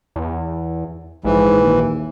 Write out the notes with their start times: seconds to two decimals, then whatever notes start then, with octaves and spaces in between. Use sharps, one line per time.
0.16 E2
1.24 A#1 G#2 E3
1.62 D#2